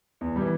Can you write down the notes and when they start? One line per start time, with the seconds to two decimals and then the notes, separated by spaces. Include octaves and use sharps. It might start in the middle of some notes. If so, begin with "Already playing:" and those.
0.21 E2
0.36 G3
0.41 E3